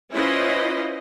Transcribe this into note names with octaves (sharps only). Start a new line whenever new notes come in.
C#4 E4 F4 B4 C5 D#5